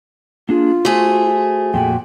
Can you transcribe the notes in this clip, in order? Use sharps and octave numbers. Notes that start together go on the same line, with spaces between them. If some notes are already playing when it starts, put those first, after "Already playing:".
A#3 D4 F4 G#4
A3 F#4 G#4 C5
F2 A#2 F#4 G5